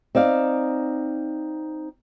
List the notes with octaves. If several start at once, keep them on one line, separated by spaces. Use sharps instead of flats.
C4 D#4 D5 F5